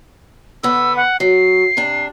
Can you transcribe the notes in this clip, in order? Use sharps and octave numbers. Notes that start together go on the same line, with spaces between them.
D3 B3 E6
F#5
F#3 C7
C3 D4